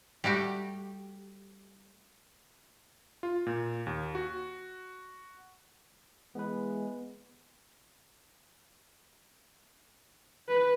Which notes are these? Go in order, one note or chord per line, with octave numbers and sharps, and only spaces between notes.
G3 A3 F#4 G4
F4
A#2
D#2
F#4
E3 G#3 B3 B4
B4